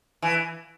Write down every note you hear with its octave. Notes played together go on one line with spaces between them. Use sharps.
E3